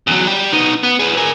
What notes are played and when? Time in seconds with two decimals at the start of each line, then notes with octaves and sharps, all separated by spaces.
0.07 E2 F#3
0.27 G3 G5
0.52 B3 D#4
0.83 B3
0.99 G#4 B4
1.17 A#4 G#5